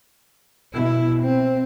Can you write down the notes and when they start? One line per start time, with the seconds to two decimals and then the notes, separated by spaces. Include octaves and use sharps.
0.73 B2 E4
1.22 C4